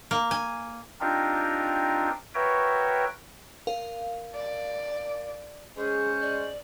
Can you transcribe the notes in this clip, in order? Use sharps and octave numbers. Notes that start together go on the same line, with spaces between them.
A#3
G#5
C4 D4 D#4 F4 G4 A#4
F#4 A#4 B4 C#5 E5 G5
A#4 F5
D5
G#3 C#4 G#4 C5
D5